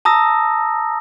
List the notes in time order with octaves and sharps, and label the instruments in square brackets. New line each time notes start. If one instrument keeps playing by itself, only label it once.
[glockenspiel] A5 A#5 D#6 E6 A#6